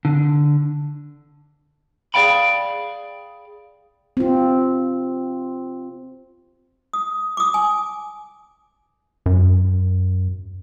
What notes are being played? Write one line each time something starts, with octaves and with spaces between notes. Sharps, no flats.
D3
G#4 A4 D5 F5 G5 B5
C4 F4
D#6
D6 D#6
G#5
F#2